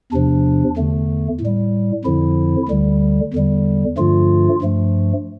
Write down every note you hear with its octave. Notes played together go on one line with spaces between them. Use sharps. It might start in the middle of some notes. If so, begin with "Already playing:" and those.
E2 C3 F3 D4
E2 D3 A3
A2
G3
F2 D3 F3 E4
D2 D3 G3
E2 D3 G3
G2 D3 F3 A3 F4
G2 F3 A3